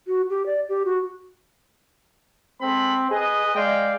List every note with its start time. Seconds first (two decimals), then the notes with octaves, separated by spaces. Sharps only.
0.07 F#4
0.30 G4
0.46 D5
0.69 G4
0.85 F#4
2.61 G#3 C4 A4 B5
3.11 G#4 B4 D#5
3.55 G#3 D5 F5 G5